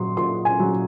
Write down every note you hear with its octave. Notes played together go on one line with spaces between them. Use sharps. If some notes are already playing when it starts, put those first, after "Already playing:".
Already playing: A#2 F#3 C6
A#2 C6
G#5
F#3